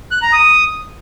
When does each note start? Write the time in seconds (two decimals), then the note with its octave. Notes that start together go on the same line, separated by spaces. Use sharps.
0.11 F#6
0.22 A#5
0.33 D#6